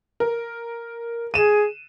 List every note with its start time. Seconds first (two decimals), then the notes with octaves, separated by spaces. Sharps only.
0.20 A#4
1.34 G#4 D#7 E7